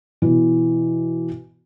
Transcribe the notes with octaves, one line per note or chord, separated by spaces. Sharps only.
B2 E3